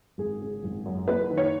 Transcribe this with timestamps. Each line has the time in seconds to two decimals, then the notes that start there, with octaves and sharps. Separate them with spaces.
0.18 G#1 G#4
0.41 C#3
0.64 G#1
0.86 F#2
1.08 F#1 B4
1.31 D#3
1.37 C#5